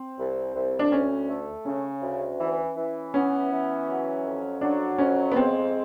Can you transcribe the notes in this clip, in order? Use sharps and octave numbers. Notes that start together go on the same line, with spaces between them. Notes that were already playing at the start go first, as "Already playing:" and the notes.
Already playing: C4
C2
C2
D4
D2 C#4
A3
C#3 C#4
D2
E3
E3
B3 C#4
E3
F#3
F2
F#3 D4
F2 C#4
B3
G#3 C4